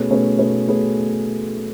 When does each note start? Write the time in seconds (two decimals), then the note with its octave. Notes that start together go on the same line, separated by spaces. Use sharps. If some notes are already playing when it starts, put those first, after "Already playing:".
Already playing: B2 A3 C#4 G#4 B4
0.10 B2 A3 C#4 G#4 B4
0.39 B2 A3 C#4 G#4 B4
0.68 B2 A3 C#4 G#4 B4